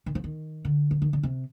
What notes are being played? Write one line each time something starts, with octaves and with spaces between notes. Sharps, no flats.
D#3
F3
D#3
D3
F3
D#3
D3
C3